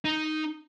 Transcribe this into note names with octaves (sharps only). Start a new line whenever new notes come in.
D#4